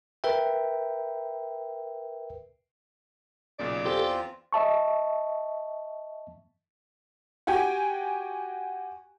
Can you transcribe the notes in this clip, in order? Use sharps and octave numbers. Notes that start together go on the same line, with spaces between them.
A#4 B4 E5 G5
B1 A#2 C#3 D5
E2 C4 F4 G4 A4
D#5 E5 A5 C#6
F#4 G4 G5 G#5